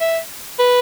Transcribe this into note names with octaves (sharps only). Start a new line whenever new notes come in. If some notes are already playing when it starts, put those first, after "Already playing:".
E5
B4